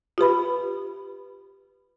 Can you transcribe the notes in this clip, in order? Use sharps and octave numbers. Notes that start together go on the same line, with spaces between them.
F4 G4 B4 B5